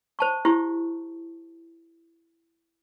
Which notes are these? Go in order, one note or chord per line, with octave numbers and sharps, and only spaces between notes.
C5 A5 C#6
E4 G4 C5 C#6